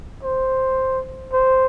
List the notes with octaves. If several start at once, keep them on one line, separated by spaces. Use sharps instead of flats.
C5
C5